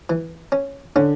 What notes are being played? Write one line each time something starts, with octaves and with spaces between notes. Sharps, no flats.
E3
C#4
D3 C#4